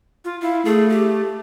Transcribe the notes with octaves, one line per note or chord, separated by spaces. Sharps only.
F4
E4 F5
A3 G#4
G4